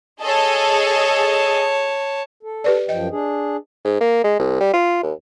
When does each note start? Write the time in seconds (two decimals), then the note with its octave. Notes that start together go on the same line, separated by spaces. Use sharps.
0.22 G#4 A4 C#5 D#5 A5
2.43 A4
2.64 G4 B4 D5
2.89 F#2 F3 D#5 G5
3.11 D4 G#4
3.85 G#2
4.01 A#3
4.24 G#3
4.39 C2
4.61 G3
4.73 F4
5.03 D#2